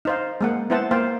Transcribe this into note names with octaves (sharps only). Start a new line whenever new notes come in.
D#4 C5 F5
G#3 A#3 F#5
B3 E4 C5 E5 F#5 A5
A#3 C5 F5 G5